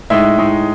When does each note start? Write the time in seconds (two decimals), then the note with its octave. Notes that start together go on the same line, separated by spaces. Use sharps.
0.10 A2 G#3 D#4 E5
0.38 A2 G#3 D#4